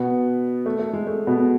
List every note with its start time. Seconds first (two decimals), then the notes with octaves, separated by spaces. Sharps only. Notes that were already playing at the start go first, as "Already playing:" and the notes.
Already playing: B2 B3
0.66 A3
0.79 A3
0.93 G#3
1.07 A3
1.27 B2 B3